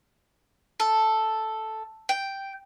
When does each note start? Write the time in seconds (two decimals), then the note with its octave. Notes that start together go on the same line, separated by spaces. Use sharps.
0.80 A4
2.09 G5